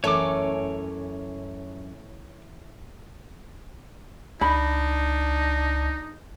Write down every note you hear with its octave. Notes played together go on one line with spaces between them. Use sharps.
F#2 E3 A3 C#4 C#5 D6
C#2 D4 D#4 B5